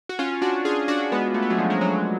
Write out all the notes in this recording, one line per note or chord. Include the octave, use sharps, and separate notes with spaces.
F#4
C#4 F4
D4 F#4
F4 G#4
D4 F#4
G#3 B3
A3
B3
F#3 A3
F3 G#3
G#3
F#3